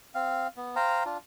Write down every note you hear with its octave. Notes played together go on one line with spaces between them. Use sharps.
C4 F5
B3
C5 F5 G5 A#5
D4 F4